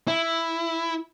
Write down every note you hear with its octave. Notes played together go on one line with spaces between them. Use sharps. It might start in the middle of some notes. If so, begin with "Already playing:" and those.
E4